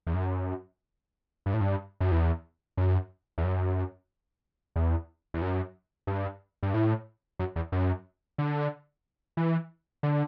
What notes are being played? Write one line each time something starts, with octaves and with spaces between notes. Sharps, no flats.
E2
F#2
G2
A2
G2
F#2
E2
F#2
E2
F#2
E2
E2
F#2
G2
G2
A2
F#2
E2
F#2
D3
E3
D3